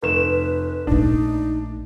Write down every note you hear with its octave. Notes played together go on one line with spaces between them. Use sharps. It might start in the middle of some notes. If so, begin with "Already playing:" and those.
F1 B4 E7
A#1 A3 D4 D#4